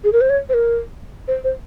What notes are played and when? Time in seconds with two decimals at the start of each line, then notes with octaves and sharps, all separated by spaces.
0.04 G#4
0.13 A#4
0.21 C5
0.30 C#5
0.49 C5
0.54 A#4
1.28 C5
1.44 C5